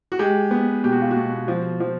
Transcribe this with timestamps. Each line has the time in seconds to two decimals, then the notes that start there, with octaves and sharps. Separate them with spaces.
0.12 F#4
0.19 G#3 G4
0.51 B3
0.84 B2 G4
0.92 F#4
1.02 F4
1.11 F#4
1.16 B2
1.48 F3
1.80 F3